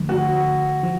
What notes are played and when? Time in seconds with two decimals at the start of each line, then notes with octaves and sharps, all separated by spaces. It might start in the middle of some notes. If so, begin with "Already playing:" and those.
Already playing: D3 F3 A3
0.09 F#4
0.83 F3